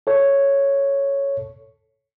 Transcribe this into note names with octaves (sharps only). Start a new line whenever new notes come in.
A4 C#5